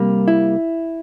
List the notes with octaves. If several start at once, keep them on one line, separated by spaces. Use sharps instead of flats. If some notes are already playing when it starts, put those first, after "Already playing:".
Already playing: C2 C3 G3 A#3
E4